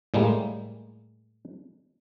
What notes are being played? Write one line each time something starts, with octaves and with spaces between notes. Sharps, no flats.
A2 G3 G#3 A#3